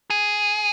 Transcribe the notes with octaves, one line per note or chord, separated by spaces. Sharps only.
G#4